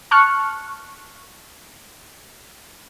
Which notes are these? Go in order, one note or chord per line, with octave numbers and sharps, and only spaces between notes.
A5 C#6 F6 F#6 C#7